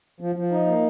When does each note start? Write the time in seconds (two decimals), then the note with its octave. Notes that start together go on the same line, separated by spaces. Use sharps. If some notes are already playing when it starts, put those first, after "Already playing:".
0.20 F3
0.36 F3
0.51 D#4
0.67 A#3